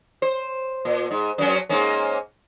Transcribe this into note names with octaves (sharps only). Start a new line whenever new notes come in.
C5
A#2
G#2
F#2 F#3 C#4
G#2 A#3 C#4